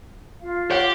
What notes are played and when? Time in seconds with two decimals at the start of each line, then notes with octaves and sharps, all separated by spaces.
0.40 F4 F5
0.71 G4 C#5 F#5